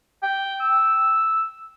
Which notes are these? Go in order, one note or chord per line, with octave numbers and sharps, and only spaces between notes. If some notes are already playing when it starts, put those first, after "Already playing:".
G5
E6